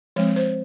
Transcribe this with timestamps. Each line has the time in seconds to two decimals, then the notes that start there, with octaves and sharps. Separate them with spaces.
0.16 F3 G#3 C4 C#5
0.36 C5